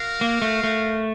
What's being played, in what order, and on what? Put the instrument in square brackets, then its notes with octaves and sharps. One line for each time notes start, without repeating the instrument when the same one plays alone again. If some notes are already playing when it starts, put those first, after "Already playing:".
Already playing: [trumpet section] F#4 A#4 F5
[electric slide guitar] A#3
A3
A3